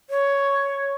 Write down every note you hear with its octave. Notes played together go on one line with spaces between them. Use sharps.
C#5